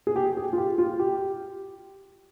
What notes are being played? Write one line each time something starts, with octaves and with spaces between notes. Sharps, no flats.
G#4
G4
G#4
F4
G4
F4
G4